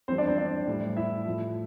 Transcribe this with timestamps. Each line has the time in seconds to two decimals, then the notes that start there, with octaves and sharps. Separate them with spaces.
0.08 F2 E3 G3 C4 C5
0.18 D4 D5
0.28 C4 C5
0.38 D4 D5
0.67 A2 G3
0.97 E4 E5
1.26 A2 F3